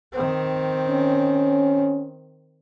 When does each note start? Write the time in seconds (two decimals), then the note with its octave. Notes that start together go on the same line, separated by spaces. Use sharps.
0.14 D#3 C4
0.87 C#4